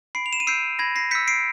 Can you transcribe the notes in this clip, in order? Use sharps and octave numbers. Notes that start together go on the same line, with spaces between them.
B5 C7 D7
F7
E7
D#7
E6 G6 C7 D7
B5 G#6 A#6
A#6 C7
E6 G6 B6 C#7
C7 D7